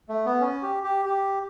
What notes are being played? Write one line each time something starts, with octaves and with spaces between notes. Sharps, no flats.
A3
B3
C#4
G4
G4
G4